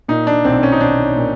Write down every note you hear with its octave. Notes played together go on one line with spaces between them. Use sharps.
A#2 D#4
D4
B1 C4
C#4
D#4
B1 D4
A#2